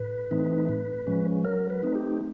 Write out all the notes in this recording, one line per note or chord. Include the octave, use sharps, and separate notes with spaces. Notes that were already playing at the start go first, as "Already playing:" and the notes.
Already playing: A2 B4
E3 A3 C4 D#4
A2
F3 G#3 C#4
F#3 A#4
B4
A3 C4 D#4
G4